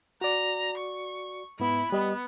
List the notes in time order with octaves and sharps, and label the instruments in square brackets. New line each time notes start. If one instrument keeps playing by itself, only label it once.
[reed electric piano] F#4 D5 [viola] A#5
[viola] C#6
[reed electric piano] G#2 B3 [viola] E4 B5
[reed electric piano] G3 G4 D#5 [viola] B3